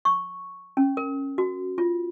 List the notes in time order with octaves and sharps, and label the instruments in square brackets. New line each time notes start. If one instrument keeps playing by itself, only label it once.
[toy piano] C#6
C#4
A#4
F#4
F4